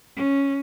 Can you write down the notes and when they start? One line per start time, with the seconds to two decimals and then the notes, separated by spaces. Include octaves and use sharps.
0.16 C#4